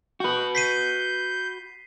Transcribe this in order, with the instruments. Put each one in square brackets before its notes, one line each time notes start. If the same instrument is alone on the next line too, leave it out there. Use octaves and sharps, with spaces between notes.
[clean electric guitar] F#4 B4 [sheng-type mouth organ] G6
[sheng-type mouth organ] G6 [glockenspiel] B6 C7 D#7